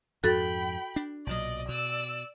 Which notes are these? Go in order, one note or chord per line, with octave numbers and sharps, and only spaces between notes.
F2 G#2 F#4 A4 G5 B5 A6
D4
B1 A#2 F#3 D5 D#5
B2 D5 E6